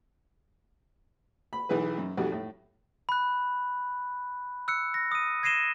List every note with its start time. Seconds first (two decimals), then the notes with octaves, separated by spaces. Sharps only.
1.53 B5
1.69 B1 E3 G#4 B4
1.98 F#2
2.17 B1 F2 G3 F#4 G4
2.32 A2
3.09 B5 F#6
4.68 E6 F#6 C#7
4.94 A#6
5.12 D#6 D#7
5.43 G#6 A#6 C7 D#7 E7 G7